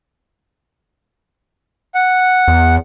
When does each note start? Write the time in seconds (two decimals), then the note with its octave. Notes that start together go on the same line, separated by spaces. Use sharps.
1.95 F#5
2.48 E2